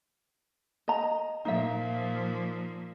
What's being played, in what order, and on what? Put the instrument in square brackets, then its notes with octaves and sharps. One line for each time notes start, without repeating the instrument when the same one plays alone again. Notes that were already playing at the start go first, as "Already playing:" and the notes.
[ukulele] D#5 A#5
[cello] A#2 F3 [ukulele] D#4 E5